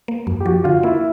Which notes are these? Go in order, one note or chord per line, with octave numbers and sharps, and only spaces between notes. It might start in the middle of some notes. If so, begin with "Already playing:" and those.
A#3
F#2
G4
F3 F#4
D3 F4
A#3 E4